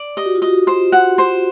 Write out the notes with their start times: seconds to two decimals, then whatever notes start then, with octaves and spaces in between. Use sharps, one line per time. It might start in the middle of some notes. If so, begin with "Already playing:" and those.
Already playing: D5
0.17 G4 D#5
0.26 F#4
0.35 F4
0.42 F#4 D#5
0.67 C5
0.92 F#5
1.18 C5